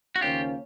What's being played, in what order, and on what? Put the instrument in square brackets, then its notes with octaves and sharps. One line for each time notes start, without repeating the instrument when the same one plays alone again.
[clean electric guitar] F#4
[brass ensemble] D#2 C#3 F3 A#3 C#4 [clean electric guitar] F4 G4